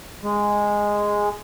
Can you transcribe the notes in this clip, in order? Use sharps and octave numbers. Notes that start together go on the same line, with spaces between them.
G#3